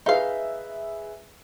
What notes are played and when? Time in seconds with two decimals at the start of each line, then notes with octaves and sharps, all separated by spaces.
0.06 D#4 G#4 B4 E5 F5